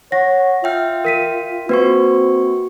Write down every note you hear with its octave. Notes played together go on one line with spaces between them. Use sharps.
C#5 F#5 A#6
F4 E5 G5 F6
A#4 B6 D#7
A#3 C4 F#4 B4 C#6